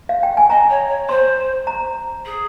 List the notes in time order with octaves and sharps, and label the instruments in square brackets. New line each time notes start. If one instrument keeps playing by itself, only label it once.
[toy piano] F5
G5
G#5
[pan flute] D#5 [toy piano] A#5
[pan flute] C#5
C#5
[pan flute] C5 [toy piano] C6
[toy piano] A#5
[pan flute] G#4